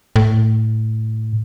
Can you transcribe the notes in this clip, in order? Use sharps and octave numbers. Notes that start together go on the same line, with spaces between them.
A2